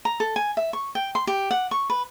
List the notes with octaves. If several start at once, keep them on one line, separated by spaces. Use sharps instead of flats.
A#5
A4
G#5
E5
C#6
G5
C6
G4
F#5
C#6
B4